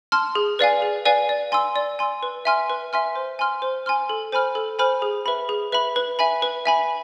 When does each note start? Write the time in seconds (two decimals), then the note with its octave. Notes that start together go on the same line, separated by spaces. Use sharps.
0.12 A5 C6 F6
0.35 G#4
0.59 B4 D5 F5 G#5
0.82 G#4
1.05 B4 D5 F5 G#5
1.29 D5
1.52 G#5 C6 E6
1.76 D5
1.99 G#5 C6 E6
2.23 B4
2.45 E5 G#5 C6 F6
2.70 B4
2.93 E5 G#5 C6 F6
3.16 C5
3.39 G#5 C6 F6
3.62 C5
3.86 G#5 C6 F6
4.09 A4
4.32 C5 G#5 B5 F6
4.55 A4
4.79 C5 G#5 B5 F6
5.02 G#4
5.26 B4 E5 B5
5.49 G#4
5.72 B4 E5 B5
5.96 B4
6.19 E5 G#5 B5
6.42 B4
6.66 E5 G#5 B5